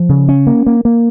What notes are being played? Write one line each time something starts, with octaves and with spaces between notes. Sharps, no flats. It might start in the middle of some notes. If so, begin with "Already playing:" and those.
Already playing: F3
C#3
C#4
A#3
A#3
A#3